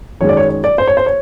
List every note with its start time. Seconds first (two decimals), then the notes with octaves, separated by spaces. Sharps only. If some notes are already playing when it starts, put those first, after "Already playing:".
0.21 F#2 D#3 G#3 C#5
0.29 D5
0.37 C#5
0.49 C#5
0.64 D5
0.78 C5
0.87 C#5
0.97 C5
1.06 C#5